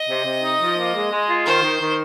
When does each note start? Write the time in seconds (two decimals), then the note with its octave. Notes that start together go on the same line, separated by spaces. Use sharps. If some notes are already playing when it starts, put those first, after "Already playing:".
Already playing: D#5
0.09 C3
0.25 C3
0.42 D#4
0.60 F3
0.78 A#3
0.94 G#3
1.11 G#3
1.28 F4
1.45 D#3 C5
1.63 D#3
1.80 D#3